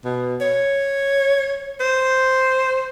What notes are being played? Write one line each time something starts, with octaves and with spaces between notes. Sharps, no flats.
B2
C#5
C5